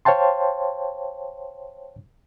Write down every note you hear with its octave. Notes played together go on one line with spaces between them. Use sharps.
C5 C#5 F5 G5 A5 C6